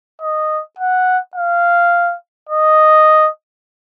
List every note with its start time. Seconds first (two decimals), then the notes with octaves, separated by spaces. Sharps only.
0.22 D#5
0.79 F#5
1.35 F5
2.49 D#5